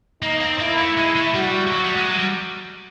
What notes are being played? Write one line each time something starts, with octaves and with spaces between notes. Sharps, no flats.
A#3 D#4
C4
A#3 E4
A3
G#3
A3
G3 F#4
F3
F#3
G3
G#3
F#3
G3